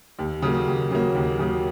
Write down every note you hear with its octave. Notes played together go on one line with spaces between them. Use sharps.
D#2
C#3 F#3 A#3
D#2
C#3 F#3 A#3
D#2
C#3 F#3 A#3